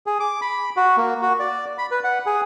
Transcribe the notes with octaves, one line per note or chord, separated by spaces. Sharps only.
G#4
D6
B5
F#4
A#3
F#4
D5
B5
B4
F#5
G#4